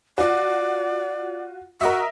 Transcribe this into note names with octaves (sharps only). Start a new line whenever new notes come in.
F4 F#4 D5
F#4 A#4 D#5 E5